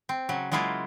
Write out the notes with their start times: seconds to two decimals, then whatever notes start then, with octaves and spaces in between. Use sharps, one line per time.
0.09 C4
0.29 C#3 F#3
0.52 F#3 G#3 A#3 E4 F4